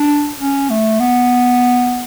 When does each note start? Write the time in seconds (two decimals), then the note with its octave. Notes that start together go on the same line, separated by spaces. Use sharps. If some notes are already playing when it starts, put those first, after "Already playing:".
Already playing: D4
0.40 C#4
0.70 A3
1.00 B3